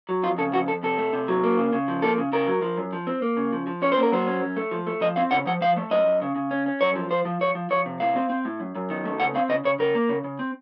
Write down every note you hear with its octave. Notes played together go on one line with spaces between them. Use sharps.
F#3
F2 F4
C#3 A4
F2 F#4
F2 A4
C3 A4
A3
C3
F#3
A#3
C#3
C#3
F3
A#3 A4
C#3
C#3 A#4
F#3
F3
F#2
F3
C4
A#3
C#3
F3
F3
C#4 C#5
C5
A#3
A#4
F#3 C5
C#4
F#2
A3
F3
A3
F3 D#5
C4 F5
C#3 F#5
F3 F#5
F3 F5
A3
F#2 D#5
F#2
C#3
C#3
C#4
C#4
F#2 C#5
F3
F3 C5
F3
F3 C#5
F3
F3 C#5
C3
A2 F5
C4
C4
A2
F#2
F#2
D#3
A3
C#3 F#5
C4 F5
C#3 D#5
C#3 C#5
C#3 A#4
A#3
C#3
C#3
C4